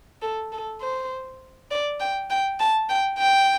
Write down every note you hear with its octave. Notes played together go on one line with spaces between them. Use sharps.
A4
A4
C5
D5
G5
G5
A5
G5
G5